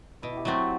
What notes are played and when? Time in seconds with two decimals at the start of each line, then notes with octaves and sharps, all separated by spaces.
0.22 B2 E4
0.37 G4
0.45 F#3 A3 C4 F#4